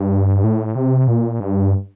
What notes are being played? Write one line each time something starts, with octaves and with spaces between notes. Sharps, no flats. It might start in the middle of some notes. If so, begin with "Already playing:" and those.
Already playing: G2
A2
C3
A#2
G2